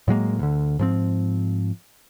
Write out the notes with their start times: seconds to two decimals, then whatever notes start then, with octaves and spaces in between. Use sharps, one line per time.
0.08 A2 F#3 G#3 A#3
0.39 D2 D3
0.79 G#2 F3 C4